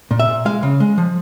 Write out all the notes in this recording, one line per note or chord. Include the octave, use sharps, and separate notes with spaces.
A#2
E5
A#2
G#3 F5
C#3
G#3
F3